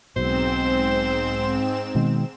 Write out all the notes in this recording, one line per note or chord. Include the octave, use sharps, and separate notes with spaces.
B1 G#2 B2 C4 C5 E7
B2 D#3 G#3